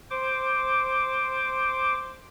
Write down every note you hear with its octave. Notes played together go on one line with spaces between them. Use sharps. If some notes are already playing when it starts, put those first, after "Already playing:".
C5 D6